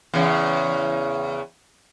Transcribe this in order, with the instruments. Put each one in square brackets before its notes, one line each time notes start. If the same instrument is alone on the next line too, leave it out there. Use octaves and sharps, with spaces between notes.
[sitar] E2 C#3